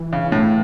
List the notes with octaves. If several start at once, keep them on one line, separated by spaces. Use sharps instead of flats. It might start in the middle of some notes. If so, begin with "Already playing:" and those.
Already playing: E3
C#3
A2